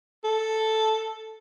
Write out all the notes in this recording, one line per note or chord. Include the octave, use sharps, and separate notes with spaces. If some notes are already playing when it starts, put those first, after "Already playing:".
A4